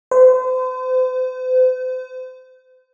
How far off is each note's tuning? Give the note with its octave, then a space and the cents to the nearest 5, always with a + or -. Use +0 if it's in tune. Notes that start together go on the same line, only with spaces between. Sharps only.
C5 -40